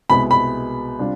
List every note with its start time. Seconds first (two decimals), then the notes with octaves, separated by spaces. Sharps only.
0.10 C2 B2 G#3 B3 B5
0.31 B5
0.99 C3 G3 D4 F4